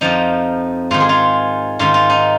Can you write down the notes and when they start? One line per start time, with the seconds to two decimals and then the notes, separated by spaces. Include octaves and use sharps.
0.01 F2 F3 D#4
0.91 G#2 D#3 F4
1.00 G#4
1.09 F4
1.79 G#2 D#3 F4
1.94 F4
2.10 D#4